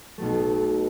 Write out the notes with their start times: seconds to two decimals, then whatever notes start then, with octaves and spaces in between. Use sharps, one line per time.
0.18 B1 B2 F#3 A3